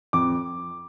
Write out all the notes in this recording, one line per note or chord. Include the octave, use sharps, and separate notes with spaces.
F2 D6